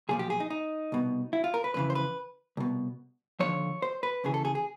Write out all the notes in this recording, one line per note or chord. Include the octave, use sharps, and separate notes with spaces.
B1 A#2 F3 G#4
G4
G#4
D#4
D#4
C2 B2
E4
F4
A#4
B4
F2 C#3 E3 B4
C5
B4
C2 B2
D#2 D3 F3 C#5
C5
B4
D#2 C#3 E3 G#4
A4
G#4
G#4